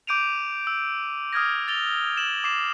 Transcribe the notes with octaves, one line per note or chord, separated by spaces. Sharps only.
D6 G6 D7 D#7 F7
E6
D#6 F6 G#6 A#6
A6 F7 G7
E7 F#7
D6 C7 E7